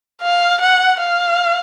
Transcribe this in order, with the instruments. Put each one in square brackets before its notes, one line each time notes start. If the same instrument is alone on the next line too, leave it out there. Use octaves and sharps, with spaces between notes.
[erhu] F5
F#5
F5